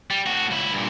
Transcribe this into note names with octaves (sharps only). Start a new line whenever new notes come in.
G3
A2 F#4
C#2 E4
G2 A#2